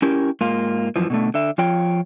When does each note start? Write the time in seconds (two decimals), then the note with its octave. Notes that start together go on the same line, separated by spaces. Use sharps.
0.02 C#4 E4 G4 A#4
0.41 G#2 A#3 F4
0.96 F#2 E3 F3
1.10 B2 D3 A3
1.34 D3 E5
1.58 F3 F4 C#5 G5